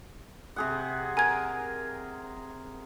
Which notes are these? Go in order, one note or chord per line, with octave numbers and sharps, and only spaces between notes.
C3 G#4 F#5
A#4 G#5 G#6